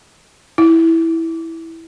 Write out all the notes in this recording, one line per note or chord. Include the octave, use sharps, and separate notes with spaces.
E4